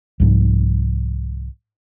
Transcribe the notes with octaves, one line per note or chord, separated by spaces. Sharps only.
C2 G#2 F3